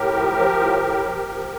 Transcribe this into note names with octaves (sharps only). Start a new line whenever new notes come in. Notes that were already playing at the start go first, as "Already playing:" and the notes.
Already playing: A2 G4 A#4
F3
F3
A2
A2
F3
F3